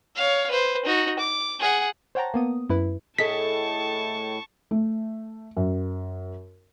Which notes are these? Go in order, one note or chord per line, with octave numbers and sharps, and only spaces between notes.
C#5 F5
B4 C5
D#4 F#4
D6
G#4 F#5
C5 C#5 F#5 G5 A5 A#5
A#3 B3 D#6
F#2 E4 B4
A2 G#4 A4 D#5 A5 C#6 B6
A3
F#2